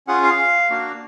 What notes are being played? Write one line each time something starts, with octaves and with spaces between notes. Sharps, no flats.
C#4 F4 G#4 F#5
F5
A#3 D4 F#4